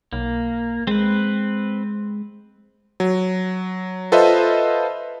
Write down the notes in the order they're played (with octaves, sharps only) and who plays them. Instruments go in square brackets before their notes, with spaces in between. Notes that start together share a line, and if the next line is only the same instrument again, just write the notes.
[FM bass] B1 [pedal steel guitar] A#3
[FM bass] G#3 [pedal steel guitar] C4 B4
[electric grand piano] F#3
F4 A4 B4 C5 D#5 E5